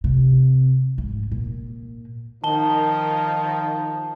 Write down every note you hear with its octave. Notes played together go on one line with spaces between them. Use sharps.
C3
G#2
A#2
D#3 F3 D#4 A5 G7